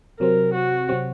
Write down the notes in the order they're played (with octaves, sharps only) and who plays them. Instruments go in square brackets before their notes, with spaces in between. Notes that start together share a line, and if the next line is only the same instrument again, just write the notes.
[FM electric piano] C3 F#3 C4 [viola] A#4
[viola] F#4
[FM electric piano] C3 F#3 C4